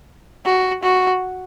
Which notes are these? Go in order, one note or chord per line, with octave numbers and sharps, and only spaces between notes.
F#4
F#4